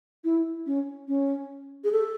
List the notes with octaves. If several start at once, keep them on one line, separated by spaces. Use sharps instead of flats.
E4
C#4
C#4
G#4
A4